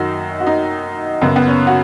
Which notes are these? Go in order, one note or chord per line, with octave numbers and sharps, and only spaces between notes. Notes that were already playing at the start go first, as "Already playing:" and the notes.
Already playing: F#2 D#3 D#4 F#4
F#4
D#4
F#2 C#3 B3
B3
C#4
F#4